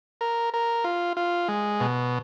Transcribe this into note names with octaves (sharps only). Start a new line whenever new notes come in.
A#4
A#4
F4
F4
G#3
B2